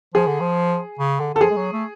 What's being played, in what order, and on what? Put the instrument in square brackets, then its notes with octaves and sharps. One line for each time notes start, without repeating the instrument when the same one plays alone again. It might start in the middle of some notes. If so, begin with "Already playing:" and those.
[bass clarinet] F3 [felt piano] G#4
[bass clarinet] D3
F3
C#3
D3
[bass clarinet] D3 [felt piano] A4
[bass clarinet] F3 [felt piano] G#4
[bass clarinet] G#3
F#3
A3